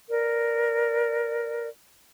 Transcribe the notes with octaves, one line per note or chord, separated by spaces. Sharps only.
A#4 B4 D5